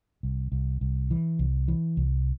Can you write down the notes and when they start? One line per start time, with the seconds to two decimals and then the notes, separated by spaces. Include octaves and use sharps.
0.23 C2
0.52 C2
0.81 C2
1.11 E3
1.39 C2
1.68 E3
1.97 C2